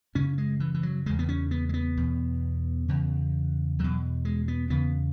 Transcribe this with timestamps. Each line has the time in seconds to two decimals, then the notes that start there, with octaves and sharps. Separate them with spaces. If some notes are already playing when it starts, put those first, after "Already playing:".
0.15 F#2 C#3 C#4
0.38 G#3
0.60 E3
0.74 E3
0.83 F#3
1.06 E2 C#3 G#3
1.19 B3
1.29 C#4
1.51 B3
1.69 G#3
1.74 B3
1.97 E2 B2
2.88 E2 C#3
3.79 E2 B2 F#3
4.25 G#3
4.48 B3
4.70 E2 C#3 B3